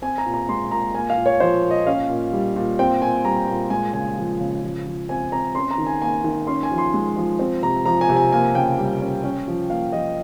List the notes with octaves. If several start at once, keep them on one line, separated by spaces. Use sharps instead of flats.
C4 G#5
A#5
A#2
A#5
G#3 C6
A#2 A#5
A#3 G#5
F5
A#2
C#5
F3 C5
A#2
D#5
C#4 F5
A#2
G3
A#2
C4 G5
A#2 G#5
G3 A#5
A#2
G#3 G#5
C#3 G#5
F3
C#3
F3
F3
C4 G#5
C4 A#5
C#4 C6
A#5
D#3
G#5
A#3 G#5
D#3
C#4 C6
G#5
F3
C6
G#3
F3
C4
C3 A#5
F3 A#5
G#5
C3
G#5
A#3 G#5
C#3 G5
G3
C#4
C#4
F3
A#3 F5
F3 D#5